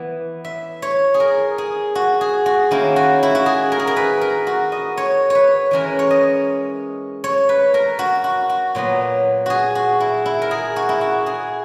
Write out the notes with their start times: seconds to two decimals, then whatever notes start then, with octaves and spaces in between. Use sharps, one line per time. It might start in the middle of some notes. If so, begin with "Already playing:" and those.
Already playing: E3 B3 E4
0.45 E5
0.82 C#5
1.14 G#4
1.20 A#4
1.58 G#4
1.95 F#4
2.21 G#4
2.46 F#4
2.71 D#3 A#3 C#4 E4
2.96 F#4
3.23 E4
3.35 F#4
3.46 G#4
3.72 A#4
3.79 G#4
3.87 A#4
3.97 B4
4.21 A#4
4.47 F#4
4.72 D#5
4.97 C#5
5.30 B4 C#5
5.71 E3 G#3 C#4 A#4
5.99 C#5
6.11 D#5
7.24 C#5
7.49 B4
7.74 A#4
7.99 F#4
8.24 F#4
8.49 F#4
8.75 A#2 F#3 B3
9.46 F#4 G#4
9.75 F#4
10.00 E4
10.26 E4
10.42 A#4
10.51 G#4
10.76 F#4
10.89 E4
11.01 F#4
11.26 G#4